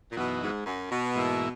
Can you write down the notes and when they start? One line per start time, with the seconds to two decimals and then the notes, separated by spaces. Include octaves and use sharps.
0.10 A#2
0.17 F#2 B2 E3 B3 D#4 F#4
0.41 G#2
0.66 F#2
0.90 B2
1.15 G#2 E3 A#3 E4